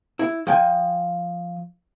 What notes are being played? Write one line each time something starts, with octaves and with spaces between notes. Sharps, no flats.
E4
F3 G5 G#5